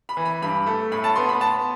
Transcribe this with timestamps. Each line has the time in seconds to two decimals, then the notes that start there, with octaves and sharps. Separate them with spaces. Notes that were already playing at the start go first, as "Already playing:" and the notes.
0.09 B5
0.17 E3
0.25 B5
0.42 G2 B5
0.66 A3
0.91 A2 B5
1.04 A5
1.16 B3 C6
1.29 B5
1.41 B3 A5